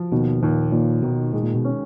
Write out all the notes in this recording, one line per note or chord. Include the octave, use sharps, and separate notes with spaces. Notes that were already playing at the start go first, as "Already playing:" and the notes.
Already playing: F3
D#2 B2
D#2 A#2
D#2 A#2
B2 D#3
A#2 G#3
A#2
B2
C#4